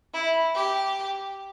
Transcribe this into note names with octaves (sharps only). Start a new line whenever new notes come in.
E4
G4